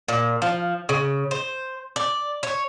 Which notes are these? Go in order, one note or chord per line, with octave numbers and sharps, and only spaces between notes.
A#2
F3
C#3
C5
D5
C#5